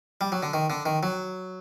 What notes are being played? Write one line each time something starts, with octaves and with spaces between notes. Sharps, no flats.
G3
F#3
D3
D#3
D3
D#3
F#3